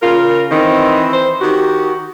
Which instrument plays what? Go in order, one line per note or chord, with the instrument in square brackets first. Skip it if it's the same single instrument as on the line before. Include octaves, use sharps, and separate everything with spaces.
[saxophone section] C#3 A#4 [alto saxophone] F4
[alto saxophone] D#3 [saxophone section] E3 C4
[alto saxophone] C5
[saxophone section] D#3 G4 [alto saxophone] F#4